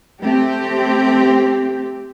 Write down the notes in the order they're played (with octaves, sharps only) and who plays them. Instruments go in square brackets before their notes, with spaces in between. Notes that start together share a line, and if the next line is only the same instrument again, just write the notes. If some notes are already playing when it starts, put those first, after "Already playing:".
[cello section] A3 C4 G4